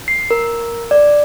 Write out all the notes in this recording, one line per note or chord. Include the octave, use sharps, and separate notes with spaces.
C7
A#4
D5